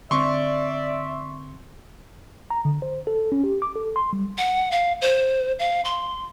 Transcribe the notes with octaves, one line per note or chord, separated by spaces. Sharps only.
D3 C4 D5 E5 C6 C#6
A#5
D3
C5
A4
C#4
G4
D6
A4
C6
G3
F#5
F5
C5
F5
C6